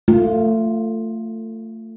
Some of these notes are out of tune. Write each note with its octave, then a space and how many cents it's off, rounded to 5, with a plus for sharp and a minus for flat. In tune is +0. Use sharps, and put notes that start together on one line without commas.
A3 +25 F4 +0